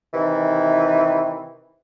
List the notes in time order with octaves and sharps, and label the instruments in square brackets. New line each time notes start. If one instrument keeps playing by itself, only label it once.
[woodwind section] C3 D#3 E3